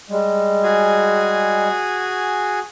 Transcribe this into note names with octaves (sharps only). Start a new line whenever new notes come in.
G3 G#3
F#4 G#4 G#5